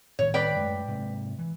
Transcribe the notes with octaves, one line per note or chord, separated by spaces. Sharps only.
A2 D#3 G3 C#5
B4 D5 G5
F#2 G#3 A3
G#2 C3 G#3
E3